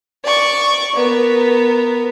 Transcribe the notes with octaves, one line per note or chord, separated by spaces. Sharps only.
D5 C#6
B3 A#4